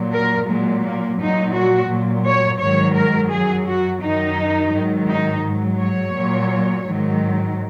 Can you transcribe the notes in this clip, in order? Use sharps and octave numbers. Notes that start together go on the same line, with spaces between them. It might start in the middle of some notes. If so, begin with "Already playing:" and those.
Already playing: A#2 F#3
A#4
A#2 F#3 G#3
A#3
A#2 F#3 D#4
F#4
A#2 F#3
C#5
G#2 D#3 F#3 C#5
A#4
F#2 F#3 G#4
F#4
F#2 D#3 F#3 D#4
G#2 D#3 F#3
D#4
G#2 F#3
C#5
A#2 F#3
G#2 D#3 F#3